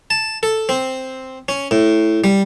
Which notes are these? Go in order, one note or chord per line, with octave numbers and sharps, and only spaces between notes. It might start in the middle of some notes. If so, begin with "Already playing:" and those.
A5
A4
C4
C#4
A2
G3